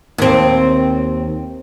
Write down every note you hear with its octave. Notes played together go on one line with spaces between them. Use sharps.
D#2 C4